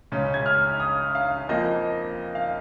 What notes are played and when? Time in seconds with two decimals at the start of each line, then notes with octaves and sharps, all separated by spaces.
0.12 C#2 C#3 G#3 C#4
0.34 G#6
0.46 F6
0.80 D#6
1.15 F5
1.49 F2 F3 A#3 D#5
2.35 F5